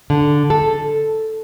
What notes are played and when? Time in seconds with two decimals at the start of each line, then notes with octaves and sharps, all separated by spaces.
0.10 D3
0.50 A4